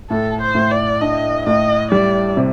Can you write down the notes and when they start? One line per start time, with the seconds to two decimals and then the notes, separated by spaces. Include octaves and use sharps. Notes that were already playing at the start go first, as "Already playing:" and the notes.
0.10 A2 A4
0.41 C5
0.55 A2
0.71 D5
1.01 D4 D#5
1.46 A2 D#5
1.91 G3 D5
2.37 C3